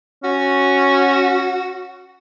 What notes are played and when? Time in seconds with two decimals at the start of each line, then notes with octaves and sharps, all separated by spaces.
0.24 C#4 F#4